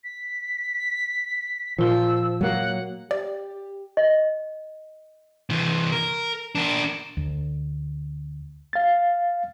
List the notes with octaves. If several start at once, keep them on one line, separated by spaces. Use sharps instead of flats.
B6
A#2 F3 F4 E6
F#3 A#3 F#5
G4 D5
D#5
C3 E3
A#4
D4 A#4
D2
F5 A6